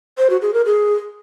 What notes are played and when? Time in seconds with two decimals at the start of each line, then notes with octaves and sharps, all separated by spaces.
0.18 C5
0.30 F#4
0.42 G#4
0.54 A#4
0.66 G#4